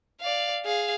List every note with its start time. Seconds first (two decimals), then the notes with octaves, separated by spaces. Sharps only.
0.21 D5 F5
0.65 G#4 F5